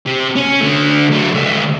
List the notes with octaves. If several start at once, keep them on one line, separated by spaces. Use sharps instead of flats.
C3
C#4
D3 A3
F#3 A3
C#2 A3